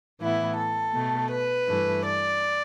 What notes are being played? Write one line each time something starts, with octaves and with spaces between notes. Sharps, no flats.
A2 E3 B3 E4
A4
B2 A3
B4
G2 E3 A3
D5